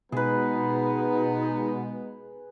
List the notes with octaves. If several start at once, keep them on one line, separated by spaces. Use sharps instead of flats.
B2 G#3 B3 D#4 G#4 B4